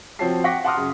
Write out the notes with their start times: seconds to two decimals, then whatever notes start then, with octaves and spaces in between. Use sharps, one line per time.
0.19 F3 C4 F#4 C#5 A5 C7
0.44 F#5 G5 C#6 D6 A#6 B6
0.64 F#5 A5 C6 D6 D#6 F6
0.77 F#2 C#3